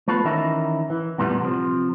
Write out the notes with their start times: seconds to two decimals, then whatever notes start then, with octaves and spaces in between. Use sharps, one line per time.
0.08 A3 B3 F4 A4 B4
0.25 D#3 E3 C#4 D#4 A#4 E5
0.90 E3
1.18 F2 A#2 E3 G3 A3 B3
1.41 C3 F3